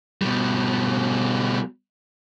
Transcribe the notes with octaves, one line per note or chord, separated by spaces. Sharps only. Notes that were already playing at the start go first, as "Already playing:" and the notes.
B2 G3